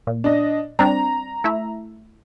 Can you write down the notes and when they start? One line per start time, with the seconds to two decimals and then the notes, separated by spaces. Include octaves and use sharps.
0.07 A#2
0.24 D4 D#5
0.79 G3 C4 D4 A#5
1.44 A3 E4 E5